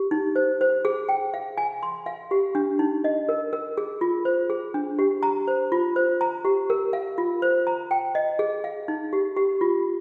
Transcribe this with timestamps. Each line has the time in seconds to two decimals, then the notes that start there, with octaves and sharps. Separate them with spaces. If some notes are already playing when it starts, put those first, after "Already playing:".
Already playing: G4
0.11 D#4
0.36 C5
0.61 C5
0.85 G#4
1.09 G5
1.34 F5
1.58 G#5
1.83 C6
2.06 F5
2.31 G4
2.55 D4
2.79 D#4
3.04 D#5
3.29 A#4
3.53 A#4
3.78 G#4
4.01 F4
4.25 C5
4.50 G#4
4.74 D4
4.99 G4
5.23 A#5
5.48 C5
5.72 F4
5.96 C5
6.21 A#5
6.45 G4
6.70 A#4
6.93 F5
7.18 F4
7.42 C5
7.67 A#5
7.91 G5
8.15 D#5
8.39 G#4
8.64 F5
8.88 D#4
9.13 G4
9.37 G4
9.61 F4